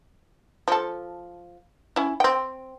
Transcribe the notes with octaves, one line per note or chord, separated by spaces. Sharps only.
F3 A4
C#4 E4
C4 G5